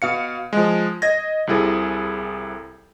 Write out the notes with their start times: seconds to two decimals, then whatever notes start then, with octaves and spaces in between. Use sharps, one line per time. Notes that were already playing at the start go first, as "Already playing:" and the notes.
0.02 B2 F5 C#7
0.53 F3 G#3
1.02 D#5 G#6 A#6
1.47 C2 C3 E4 G#4 A4